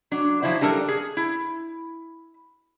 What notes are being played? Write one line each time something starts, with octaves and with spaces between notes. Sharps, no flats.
F#3 D4
F3 F#3 E4 C5
G3 D4 A4 A#4
G#4
E4